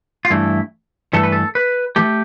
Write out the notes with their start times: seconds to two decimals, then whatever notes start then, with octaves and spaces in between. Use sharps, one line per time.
0.25 F4
0.30 G2 E3 A3 E4
1.13 G2 E3 A3 A4
1.23 B4
1.32 A4
1.55 B4
1.96 E3 A3 G4